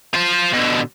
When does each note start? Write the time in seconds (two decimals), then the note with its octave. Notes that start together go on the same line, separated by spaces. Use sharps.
0.14 F4 C5
0.53 B2 D3